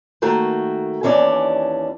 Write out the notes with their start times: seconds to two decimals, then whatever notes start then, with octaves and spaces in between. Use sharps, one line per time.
0.22 D#3 A3 A#3 F#4 G5
1.03 D#2 E3 C#4 D4 D5